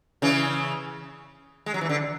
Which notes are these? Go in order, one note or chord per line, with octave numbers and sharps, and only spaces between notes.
C#3 E3
G#3
F#3
E3
D3